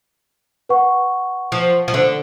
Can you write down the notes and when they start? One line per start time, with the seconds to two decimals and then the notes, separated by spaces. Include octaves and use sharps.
0.69 B4 F#5 C#6
1.52 F3
1.88 F3
1.94 D3